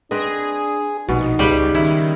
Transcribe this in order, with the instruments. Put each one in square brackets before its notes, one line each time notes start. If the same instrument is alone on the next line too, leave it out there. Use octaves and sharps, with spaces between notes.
[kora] C4 B4 D#5 [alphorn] D4 [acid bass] G#4
[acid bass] A#1 [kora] B2 B3 [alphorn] D#4
[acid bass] C#2 [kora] C#3 G4 [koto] G3 B4
[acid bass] D#3 [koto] E4